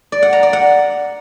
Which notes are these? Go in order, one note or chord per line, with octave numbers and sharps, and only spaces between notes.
D5
F#5
A#5
D5
F#5